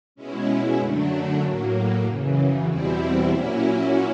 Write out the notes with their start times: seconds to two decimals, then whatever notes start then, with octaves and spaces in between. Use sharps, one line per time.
0.15 B2 G#3 C#4 E4
0.78 F#2 D3 F#3 A3 D4
1.41 A2 F#3 A#3
2.03 F#2 C#3 E3
2.64 E2 B2 G3 C4 E4
3.26 A#2 F#3 A#3 C#4 E4